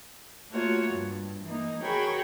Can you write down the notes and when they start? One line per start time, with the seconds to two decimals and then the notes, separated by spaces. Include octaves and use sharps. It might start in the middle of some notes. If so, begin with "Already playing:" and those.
0.50 A3 A#3 F4 F#4 C#5
0.90 G2
1.44 E3 A#3 D#4
1.81 F#4 G#4 A#4 C#5 G5 B5